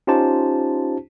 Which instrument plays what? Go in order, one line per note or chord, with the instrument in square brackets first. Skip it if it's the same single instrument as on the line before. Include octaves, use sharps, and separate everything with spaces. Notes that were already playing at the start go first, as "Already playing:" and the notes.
[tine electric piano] C#4 D#4 F4 G4 C5 A5